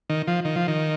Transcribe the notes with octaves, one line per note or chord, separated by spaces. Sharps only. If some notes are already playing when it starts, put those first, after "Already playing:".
D#3
F3
D#3
F3
D#3